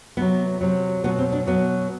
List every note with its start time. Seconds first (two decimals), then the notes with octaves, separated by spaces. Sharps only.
0.17 C3 F#3 B3
0.61 C3 F#3
1.04 B2 F#3 B3
1.18 C4
1.32 D4
1.46 B2 F#3 B3